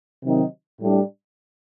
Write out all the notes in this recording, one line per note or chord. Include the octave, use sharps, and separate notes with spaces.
C3 D#3 F#3 C4 D#4
A2 G3 D4